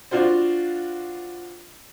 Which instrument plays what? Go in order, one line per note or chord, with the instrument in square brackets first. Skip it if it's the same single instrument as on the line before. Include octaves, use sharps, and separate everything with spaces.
[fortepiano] D4 F4 F#4 C5